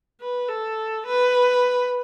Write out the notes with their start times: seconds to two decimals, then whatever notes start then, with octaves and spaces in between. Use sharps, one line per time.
0.21 B4
0.49 A4
1.07 B4